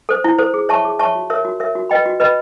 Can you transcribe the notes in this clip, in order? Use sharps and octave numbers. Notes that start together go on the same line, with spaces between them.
A4 C5
E4
A4 C5
G#4
C#5 E5 A5 C#6
G#4
C#5 E5 A5 C#6
F#4
A#4 C#5 E5
F#4
A#4 C#5 E5
F#4
B4 D#5 G5 B5
F#4
B4 D#5 G5 B5